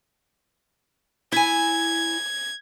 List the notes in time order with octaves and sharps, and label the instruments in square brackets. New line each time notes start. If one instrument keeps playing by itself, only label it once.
[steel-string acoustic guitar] E4 G#5 [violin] G#6